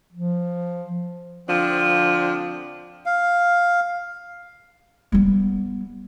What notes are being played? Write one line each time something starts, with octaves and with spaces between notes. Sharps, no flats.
F3
D3 F3 C4 D4
F5
G3 B3